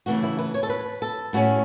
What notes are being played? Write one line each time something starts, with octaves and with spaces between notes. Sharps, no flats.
C#3 E3 A3 F#4
E4
B4
C#5
A4
B4
A4
A2 A3 C#4 F#4